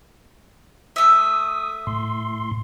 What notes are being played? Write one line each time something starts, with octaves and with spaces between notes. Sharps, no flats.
A3 E5 D#6
A2 C6